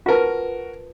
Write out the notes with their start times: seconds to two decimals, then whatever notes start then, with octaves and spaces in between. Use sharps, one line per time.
0.06 F4 F#4 A#4 B4 A5